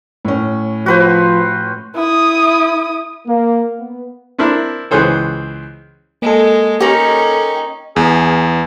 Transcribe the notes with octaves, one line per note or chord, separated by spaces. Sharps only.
A2 C#4
F3 F#4 B4 C5
E4 D#6
A#3
B3
C4 D4 E4 A#4
C#2 E3 G#4 C5 C#5
G#3 A#3 A4
C#4 D#4 G4 A#4
E2 G#4